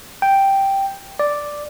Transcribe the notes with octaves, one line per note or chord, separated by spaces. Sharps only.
G5
D5